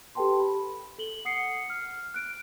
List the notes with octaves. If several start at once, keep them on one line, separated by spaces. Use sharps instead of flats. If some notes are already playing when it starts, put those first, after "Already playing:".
G4 A4 B4 G5 A5 C6
B5
A4 F#7 G7
F#5 D#6 C7 C#7
F6
F#6 D7